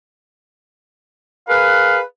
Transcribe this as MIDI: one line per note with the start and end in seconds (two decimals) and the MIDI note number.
1.49 2.02 68
1.49 2.02 70
1.49 2.02 71
1.49 1.99 77